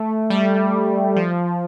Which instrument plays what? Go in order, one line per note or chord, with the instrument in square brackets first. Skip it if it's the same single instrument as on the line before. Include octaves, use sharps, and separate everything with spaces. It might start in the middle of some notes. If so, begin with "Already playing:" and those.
Already playing: [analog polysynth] A3
G3
F3